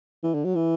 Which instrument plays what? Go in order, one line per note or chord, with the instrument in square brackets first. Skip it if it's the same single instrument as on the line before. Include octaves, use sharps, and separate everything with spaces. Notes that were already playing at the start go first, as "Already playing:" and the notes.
[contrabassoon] E3
D3
F#3
E3